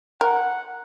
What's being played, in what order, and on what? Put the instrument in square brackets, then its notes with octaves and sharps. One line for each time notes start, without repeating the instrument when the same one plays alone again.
[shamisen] A#4 [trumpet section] F#5